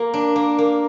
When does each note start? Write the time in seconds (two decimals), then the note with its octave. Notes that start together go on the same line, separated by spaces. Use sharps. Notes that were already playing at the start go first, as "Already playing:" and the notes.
Already playing: A#3
0.14 D4
0.36 A#3
0.58 A#3